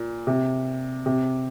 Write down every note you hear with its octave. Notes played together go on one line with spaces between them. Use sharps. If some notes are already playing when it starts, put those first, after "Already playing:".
Already playing: A#2
C3
C3